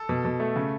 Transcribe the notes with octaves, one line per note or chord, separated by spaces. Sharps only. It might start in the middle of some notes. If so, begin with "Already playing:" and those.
Already playing: A4
B2
B2
A3
C#3